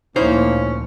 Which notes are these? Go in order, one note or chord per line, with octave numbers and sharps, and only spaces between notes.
D2 A#2 F3 A#3 C#4 D#4 E4 C5